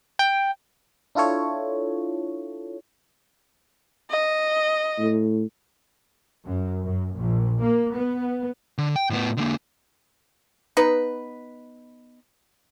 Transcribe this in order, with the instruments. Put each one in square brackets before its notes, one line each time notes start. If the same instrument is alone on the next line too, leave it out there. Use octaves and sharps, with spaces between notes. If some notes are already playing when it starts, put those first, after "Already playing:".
[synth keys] G5
[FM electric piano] D4 E4 F4 A4 C#5
[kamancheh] D#5
[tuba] A2
[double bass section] F#2
F#2
A#1
A#3
B3
[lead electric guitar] D3
G5
A2 B3
D3 A#3
[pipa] B3 D#4 B4